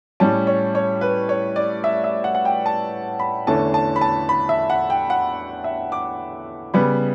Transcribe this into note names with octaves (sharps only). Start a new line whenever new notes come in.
A2 G3 C#4 A5
C#5
C#5
B4
C#5
D5
E5
E5
F#5
F#5
G5
A5
B5
E2 D3 A3 C#4 A5
A5
B5
A5
B5
E5
F#5
G5
F#5
E5
D6
C#3 G3 B3 B5